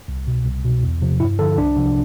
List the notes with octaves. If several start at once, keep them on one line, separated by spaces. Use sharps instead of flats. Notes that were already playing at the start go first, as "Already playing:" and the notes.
C2
B2
C2
B2
E2
C3 F3
G2 E4
D3 F3 A4
C2 D4
C3 F3